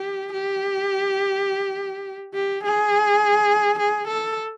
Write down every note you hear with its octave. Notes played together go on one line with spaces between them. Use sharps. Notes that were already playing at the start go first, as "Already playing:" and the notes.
Already playing: G4
G4
G4
G#4
G#4
A4